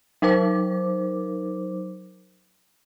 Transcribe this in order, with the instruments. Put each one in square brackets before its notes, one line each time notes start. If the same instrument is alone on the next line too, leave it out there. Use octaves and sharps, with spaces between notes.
[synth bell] F#3 D#4 A#4 C5 D6